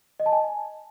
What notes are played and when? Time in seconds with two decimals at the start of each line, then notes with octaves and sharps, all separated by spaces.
0.20 D#5
0.26 A5
0.32 G#5